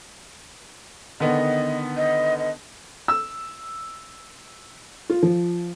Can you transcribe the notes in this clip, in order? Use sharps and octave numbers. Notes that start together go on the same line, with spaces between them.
D3 D#3 B3 D#5
D#5
D#5
E6
F4
F3